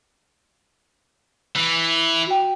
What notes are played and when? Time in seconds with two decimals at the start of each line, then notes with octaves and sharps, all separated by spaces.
1.56 E3
2.27 F#4 G5